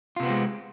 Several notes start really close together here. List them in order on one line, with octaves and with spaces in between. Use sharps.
F4 C3 B3 C4 G#3